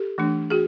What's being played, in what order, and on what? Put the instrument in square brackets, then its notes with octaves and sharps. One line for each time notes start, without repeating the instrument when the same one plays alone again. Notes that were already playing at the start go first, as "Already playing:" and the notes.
Already playing: [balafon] G4 A4
E3 A3 D4
F#4 G#4